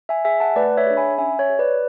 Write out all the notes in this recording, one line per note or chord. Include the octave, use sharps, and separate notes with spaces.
E5 G#5
G#4 E5 G#5
F#5 A5
A3 B4 D5
C#5 E5
D4 G#4
G#5 B5
C#4 E5 G#5
C#5
G#4
B4 D5